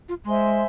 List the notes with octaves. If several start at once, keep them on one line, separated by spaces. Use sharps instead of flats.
F4
G#3 C5 E5 G#5 C6